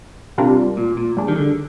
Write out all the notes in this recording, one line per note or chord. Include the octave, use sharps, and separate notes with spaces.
C3 G3 D4 F4 A#4
A#2
A#2
G3 D4 G#4
D#3
D3